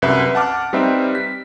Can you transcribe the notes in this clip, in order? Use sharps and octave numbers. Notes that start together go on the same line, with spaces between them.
C2 F#2 B4 E5
F#5 A5 D6 F6
G3 C4 D#4 B4 C5 E5
B6